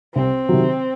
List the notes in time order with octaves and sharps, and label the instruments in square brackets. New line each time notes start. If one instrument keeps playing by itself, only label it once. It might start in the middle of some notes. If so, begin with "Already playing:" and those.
[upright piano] C2 [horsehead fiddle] C4
[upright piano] C3 D#3 F#3